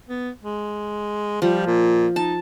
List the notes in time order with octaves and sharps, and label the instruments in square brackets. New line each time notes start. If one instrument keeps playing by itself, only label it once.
[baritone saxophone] B3
G#3
[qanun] F3 [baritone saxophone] G3
[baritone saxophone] A#2
[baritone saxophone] D#4 [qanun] A5